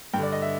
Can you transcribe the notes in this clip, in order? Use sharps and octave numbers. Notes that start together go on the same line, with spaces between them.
G2 D3 G5
D5
D#5
E5